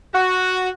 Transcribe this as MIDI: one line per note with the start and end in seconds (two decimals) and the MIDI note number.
0.14 0.69 66